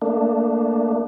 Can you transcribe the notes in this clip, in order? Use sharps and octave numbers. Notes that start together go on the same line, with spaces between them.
A3 A#3 D4